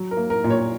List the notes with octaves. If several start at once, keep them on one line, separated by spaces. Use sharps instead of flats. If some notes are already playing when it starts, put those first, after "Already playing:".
Already playing: F#3
A#4
A#3
A#4
A#2
C#5